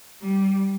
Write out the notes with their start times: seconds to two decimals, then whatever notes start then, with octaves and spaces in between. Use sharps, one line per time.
0.22 G3